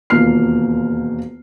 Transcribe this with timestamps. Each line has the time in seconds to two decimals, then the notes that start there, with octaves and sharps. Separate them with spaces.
0.10 E1 D#2 A#3 F4 F6 C7